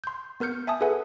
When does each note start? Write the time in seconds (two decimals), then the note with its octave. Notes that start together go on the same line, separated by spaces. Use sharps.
0.04 C6 G6
0.40 B3 A#4 F6 G6 C#7
0.67 E5 G#5 A5 D#6
0.81 G#4 A4 B4 E5 F#5 G#5